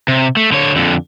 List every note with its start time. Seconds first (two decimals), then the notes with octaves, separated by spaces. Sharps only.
0.08 C3
0.37 A3
0.52 D3 C#5
0.76 F2 D3